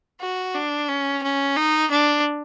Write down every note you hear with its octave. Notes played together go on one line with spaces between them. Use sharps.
F#4
D4
C#4
C#4
D#4
D4